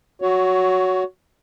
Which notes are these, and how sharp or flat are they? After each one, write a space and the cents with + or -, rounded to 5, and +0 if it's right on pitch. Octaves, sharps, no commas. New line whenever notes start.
F#4 +0 C#5 +20